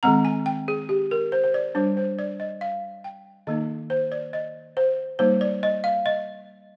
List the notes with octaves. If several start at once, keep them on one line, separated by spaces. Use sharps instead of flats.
D#3 G#3 C4 A#5
G#5
G5
G#4
G4
A#4
C5
C5
D5
G3 D4 C5
C5
D5
D#5
F5
G5
D#3 A#3 D#4 D#5
C5
D5
D#5
C5
G3 A#3 D#4 C5
D5
D#5
F5
D#5